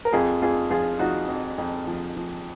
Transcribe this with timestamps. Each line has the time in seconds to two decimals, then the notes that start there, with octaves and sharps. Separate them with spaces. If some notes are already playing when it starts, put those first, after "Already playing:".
0.05 A#4
0.12 F2 F4 G#4
0.42 F2 F4 G#4
0.70 F3 F4 G#4
0.99 F3 D#4 F#4
1.28 F2
1.58 F2
1.87 F3
2.16 F3